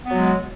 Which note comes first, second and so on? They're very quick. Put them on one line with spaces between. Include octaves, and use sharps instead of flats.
B3 F#3 G#3